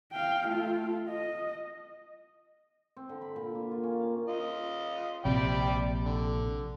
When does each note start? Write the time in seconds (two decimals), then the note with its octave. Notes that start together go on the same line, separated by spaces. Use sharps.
0.13 F5 G5
0.48 A3 F4
1.09 D#5
2.97 C4
3.09 D3
3.21 B5
3.36 A#2
3.55 A#3
3.71 F4
3.83 C#4
4.00 F5
4.28 F4 D#5
5.25 A#1 C3 D5 G5 B5
6.05 D3